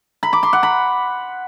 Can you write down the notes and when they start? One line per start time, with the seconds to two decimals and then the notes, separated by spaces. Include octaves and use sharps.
0.23 B5
0.33 D6
0.43 C6
0.53 F#5
0.63 B5